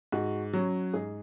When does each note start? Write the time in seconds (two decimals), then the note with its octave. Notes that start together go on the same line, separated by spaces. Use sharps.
0.12 G#2 F#4
0.53 F#3 C#4
0.94 G#2 G#4